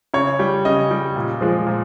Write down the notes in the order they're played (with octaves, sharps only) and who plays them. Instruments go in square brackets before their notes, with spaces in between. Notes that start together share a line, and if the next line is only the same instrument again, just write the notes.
[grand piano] C#3 C#5
G3
C#3 D#5
G3
A#2
F3 G#3
A#2